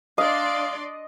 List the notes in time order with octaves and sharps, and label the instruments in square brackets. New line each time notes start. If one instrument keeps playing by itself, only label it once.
[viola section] D4 D5 C6 [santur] D#5 [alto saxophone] F5